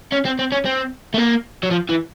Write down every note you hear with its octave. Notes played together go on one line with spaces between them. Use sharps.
C#4
C4
C4
C#4
C4
A3
A#3
F#3
F3
E3